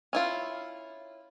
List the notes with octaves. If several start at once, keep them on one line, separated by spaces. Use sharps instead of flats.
C#4 E4 F4